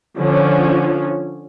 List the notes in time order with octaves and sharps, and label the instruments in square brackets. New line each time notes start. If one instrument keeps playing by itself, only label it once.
[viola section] D3 F3 C#4